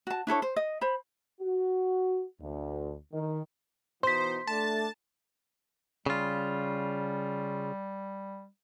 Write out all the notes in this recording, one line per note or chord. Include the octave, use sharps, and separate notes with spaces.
F#4 A5
D4 E4 A4 C#5
C5
D#5
C5 B5
F#4
D2
D#3
B2 E3 D#4 C5 C6 B6
A3 D4 A5
C#3 G3 F4